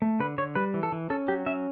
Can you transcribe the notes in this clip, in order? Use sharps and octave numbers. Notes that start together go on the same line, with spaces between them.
A3
D3 B4
D3 C#5
G3 B4
E3
A4
E3
C#4 A4
F#3 G4
C#4 E5